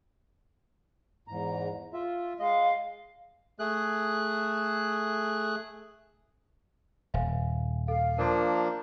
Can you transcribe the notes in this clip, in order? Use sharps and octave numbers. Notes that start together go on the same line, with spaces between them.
E2 G#2 A#5
F4 E5
G#3 D#5 F5
A3 G#4 F#6
D#1 E5 F5 G#5
A4 F5
F3 A#3 D4 A#4 A5